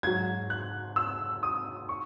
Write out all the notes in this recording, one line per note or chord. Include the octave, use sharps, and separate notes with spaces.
G#2 F#3 G#6
F#6
E6
D#6
C#6